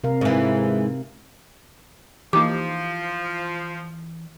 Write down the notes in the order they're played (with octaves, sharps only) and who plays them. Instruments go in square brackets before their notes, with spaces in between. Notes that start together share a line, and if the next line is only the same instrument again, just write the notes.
[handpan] C3 A#4 F5
[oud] G#2 E3 [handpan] F5
[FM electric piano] E3 [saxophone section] F3 [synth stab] A#3 D#4 G4 [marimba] D6